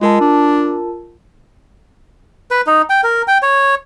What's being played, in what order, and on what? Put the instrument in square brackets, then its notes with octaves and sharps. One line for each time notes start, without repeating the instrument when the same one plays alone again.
[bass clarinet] G#3 [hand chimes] F4 A#4 A5
[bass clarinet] D4
[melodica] B4
D#4
G5
A#4
G5
C#5